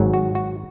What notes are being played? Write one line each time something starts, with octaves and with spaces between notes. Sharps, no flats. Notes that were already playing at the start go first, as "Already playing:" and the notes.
Already playing: G#1 G#2 F#3
F#4
F#4